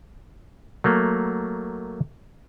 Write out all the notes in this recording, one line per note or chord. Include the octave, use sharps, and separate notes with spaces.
F#3 A3 A#3